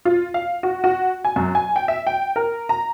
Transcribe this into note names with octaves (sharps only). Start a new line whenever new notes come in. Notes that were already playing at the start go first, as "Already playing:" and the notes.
F4
F5
F#4
F#4
G#5
F#2
G#5
G5
E5
G5
A#4
A#5